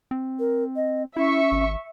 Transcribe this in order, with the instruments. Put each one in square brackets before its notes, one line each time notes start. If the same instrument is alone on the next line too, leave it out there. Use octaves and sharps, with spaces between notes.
[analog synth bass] C4
[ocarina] A#4
D#5
[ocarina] C#4 [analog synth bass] E4 [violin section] E5 C#6
[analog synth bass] G#1